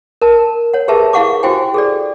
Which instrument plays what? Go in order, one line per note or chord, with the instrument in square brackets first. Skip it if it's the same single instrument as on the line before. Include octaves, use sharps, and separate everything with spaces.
[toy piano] A#4 A5
C#5 F#5
G4 G#4 A#4 B4 E5 A5
E4 G#4 F5 F#5 C#6 D6
E4 F#4 G4 C5 G5 G#5
G#4 A4 D5